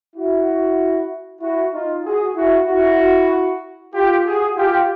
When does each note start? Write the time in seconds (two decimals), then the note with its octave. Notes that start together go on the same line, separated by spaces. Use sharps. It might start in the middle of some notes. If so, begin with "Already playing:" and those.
0.16 E4 F#4
1.41 E4 F#4
1.72 D#4 F4
2.04 F#4 G#4
2.35 E4 F#4
2.67 E4 F#4
3.94 F4 G4
4.25 F#4 G#4
4.56 F4 G4